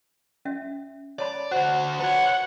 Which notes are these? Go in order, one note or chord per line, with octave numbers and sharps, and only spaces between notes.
C#4 E5
C#5 D5 A5 B5
D3 F#4 C5 F#5
F#4 B4 C#5 F#5 B5